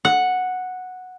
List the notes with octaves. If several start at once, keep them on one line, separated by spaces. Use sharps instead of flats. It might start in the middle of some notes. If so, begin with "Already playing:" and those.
F#5